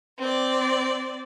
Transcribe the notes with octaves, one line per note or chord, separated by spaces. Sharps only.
C4 D5